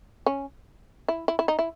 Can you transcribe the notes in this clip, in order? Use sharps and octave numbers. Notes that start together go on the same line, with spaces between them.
C#4
E4
E4
E4
D#4
E4